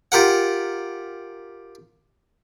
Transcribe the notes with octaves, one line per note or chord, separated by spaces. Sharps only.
F4 G4 A#4 F#5